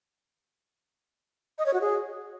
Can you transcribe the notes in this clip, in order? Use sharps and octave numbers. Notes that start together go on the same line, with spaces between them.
D#5
C#5
F#4
G#4